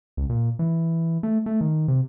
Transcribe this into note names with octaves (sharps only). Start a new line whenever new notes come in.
C#2
A#2
E3
A3
A3
D#3
C3